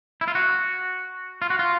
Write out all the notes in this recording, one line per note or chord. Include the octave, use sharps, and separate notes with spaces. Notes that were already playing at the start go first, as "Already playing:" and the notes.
E4
F4
F#4
F4
F#4
F4